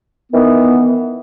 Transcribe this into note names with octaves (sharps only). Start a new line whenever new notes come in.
D#3 E3 B3